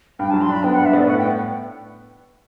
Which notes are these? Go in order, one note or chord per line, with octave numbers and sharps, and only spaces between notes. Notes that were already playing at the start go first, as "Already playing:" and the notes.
G2 G5
A5
F#3
C6
D4 B5
B3 G5
F#5
G2
E5
B3 D5
A2 F#5
G5